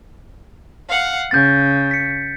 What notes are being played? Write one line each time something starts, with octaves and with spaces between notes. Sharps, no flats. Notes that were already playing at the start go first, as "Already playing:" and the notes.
F5 F#5
C#3 G6 A6
B6 C#7